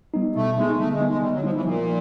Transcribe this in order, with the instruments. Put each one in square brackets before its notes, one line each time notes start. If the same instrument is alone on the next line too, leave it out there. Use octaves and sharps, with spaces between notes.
[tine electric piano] G3 B3 D#4
[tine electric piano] B2 [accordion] A3
[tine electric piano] G3 B3 D#4 [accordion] G#3
[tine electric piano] D3 [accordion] A3
[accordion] G#3
[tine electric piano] G3 B3 D#4
[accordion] G#3
[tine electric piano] D3 [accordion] G3
[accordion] F#3
[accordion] F3 [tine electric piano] G3 B3 D#4
[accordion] E3
[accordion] A#2 [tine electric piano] F3